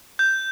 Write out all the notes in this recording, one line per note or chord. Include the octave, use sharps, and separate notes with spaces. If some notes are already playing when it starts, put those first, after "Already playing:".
G6